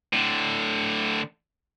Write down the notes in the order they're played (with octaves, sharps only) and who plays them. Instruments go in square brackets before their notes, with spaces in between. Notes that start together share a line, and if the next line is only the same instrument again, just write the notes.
[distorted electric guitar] A2 D3